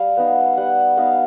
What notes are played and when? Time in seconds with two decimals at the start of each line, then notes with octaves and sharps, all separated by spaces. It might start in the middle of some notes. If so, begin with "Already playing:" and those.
Already playing: G3 F5
0.17 B3 D#4
0.57 G3 F#5
0.97 B3 D#4 F5